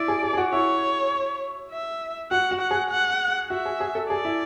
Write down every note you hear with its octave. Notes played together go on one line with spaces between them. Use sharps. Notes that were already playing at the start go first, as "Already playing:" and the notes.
Already playing: E4 D5
G#4
G#4
G#4
F#4
E4 C#5
E5
F#4 F#5
F#4
F#5
G#4
F#5
F#4 E5
G#4
G#4
A4
G#4 D5
E4